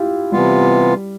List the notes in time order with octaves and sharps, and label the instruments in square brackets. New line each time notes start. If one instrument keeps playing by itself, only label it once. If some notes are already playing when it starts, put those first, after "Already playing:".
Already playing: [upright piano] E4 F4 G4
[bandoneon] C3 E3 B3 F4 [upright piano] G3